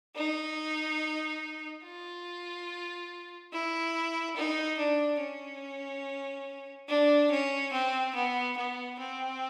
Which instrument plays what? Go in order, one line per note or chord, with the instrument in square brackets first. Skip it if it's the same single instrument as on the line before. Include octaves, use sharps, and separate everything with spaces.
[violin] D#4
F4
E4
D#4
D4
C#4
D4
C#4
C4
B3
B3
C4